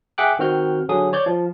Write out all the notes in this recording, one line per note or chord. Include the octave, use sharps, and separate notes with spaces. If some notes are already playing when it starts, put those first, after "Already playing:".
G#4 E5 F#5 G5 D6 F#6
D#3 C4 F#4 F6 G6
D3 F#3 G#4 D#6
C#5 D5 G6
F3